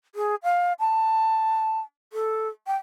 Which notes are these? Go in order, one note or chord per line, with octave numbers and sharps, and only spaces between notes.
G#4
F5
A5
A4
G5